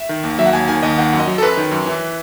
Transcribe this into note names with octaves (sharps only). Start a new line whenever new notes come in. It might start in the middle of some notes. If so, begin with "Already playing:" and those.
Already playing: E5
D#3
D#2
F#3 E5
F#5
D#2 G#5
D#3 G#5
D#2 D#5
D#3 F#5
F#2
D#5
F#3
A4
F#2 B4
D#3
F#2
E3